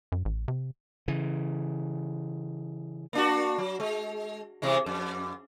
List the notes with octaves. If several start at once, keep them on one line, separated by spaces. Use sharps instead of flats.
F#2
A1
C3
C#3 E3
A#3 D4 F#4
F#3
G#3
C3 E3 G#3
F2